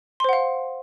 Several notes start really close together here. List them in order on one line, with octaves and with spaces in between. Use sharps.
C6 C5 F#5 F5